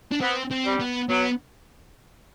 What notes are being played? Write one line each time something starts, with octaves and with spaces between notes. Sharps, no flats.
D4
B3 C4
C4
G3
B3
F#3 B3